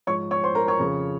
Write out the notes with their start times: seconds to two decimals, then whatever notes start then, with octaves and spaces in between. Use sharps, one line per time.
0.07 G#2 F3 C#5 C#6
0.31 C#5 C#6
0.43 C5 C6
0.55 A#4 A#5
0.68 C#5 C#6
0.79 F2 C#3 F3